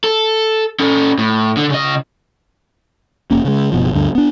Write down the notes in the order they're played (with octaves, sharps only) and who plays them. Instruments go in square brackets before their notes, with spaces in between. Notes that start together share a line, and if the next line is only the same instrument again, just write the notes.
[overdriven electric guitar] A4
C#4 A4
A2
D3
C#3 D#5
[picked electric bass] F1 A#3 C#4
C#3 G#3
F#1 B2 F3
D2 G2 D3
B3 D4